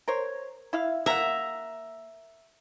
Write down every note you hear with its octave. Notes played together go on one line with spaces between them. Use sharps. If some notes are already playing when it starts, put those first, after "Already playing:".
A#4 C5 C#5
E4 E5 F5
A#3 E5 F#5 A#5